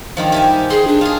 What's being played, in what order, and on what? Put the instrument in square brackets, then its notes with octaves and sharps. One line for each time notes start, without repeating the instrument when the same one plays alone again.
[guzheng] G2 D#3 F3
G4 E5 G#5
[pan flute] G#4 [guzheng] C6
[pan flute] D4
[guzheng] F4 G#4